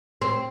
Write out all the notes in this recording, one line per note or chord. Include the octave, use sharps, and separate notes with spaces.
C4